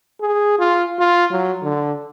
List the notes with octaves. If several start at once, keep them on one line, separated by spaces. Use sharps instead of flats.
G#4
F4
F4
F#3
D3